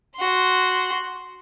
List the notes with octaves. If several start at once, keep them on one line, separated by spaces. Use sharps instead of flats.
F#4 C6